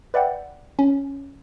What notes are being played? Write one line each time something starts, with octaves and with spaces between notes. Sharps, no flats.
B4 D5 E5 F#5 G5
C#4